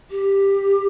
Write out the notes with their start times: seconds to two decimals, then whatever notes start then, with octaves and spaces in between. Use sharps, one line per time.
0.10 G4